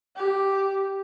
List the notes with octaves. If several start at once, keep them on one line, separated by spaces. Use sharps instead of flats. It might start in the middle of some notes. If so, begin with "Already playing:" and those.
G4